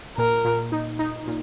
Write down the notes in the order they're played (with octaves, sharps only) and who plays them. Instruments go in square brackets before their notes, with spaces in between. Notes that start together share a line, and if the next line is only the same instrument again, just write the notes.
[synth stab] A#2 [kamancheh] A#4
[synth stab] A#2
D#4
D#4
A#2